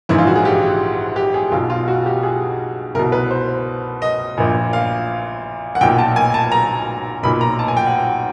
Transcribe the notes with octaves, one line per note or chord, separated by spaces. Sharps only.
A#1 G#2 E3 E4
F4
F#4
G#4
G4
G4
G#4
B1 B2 F4
F4
F#4
G4
G#4
C2 B2 A#4
B4
C5
D#5
A#1 A#2
F5
F#5
B1 A#2 G5
A5
G#5
A5
A#5
B1 A#2 B5
A#5
A5
G#5
G5
F#5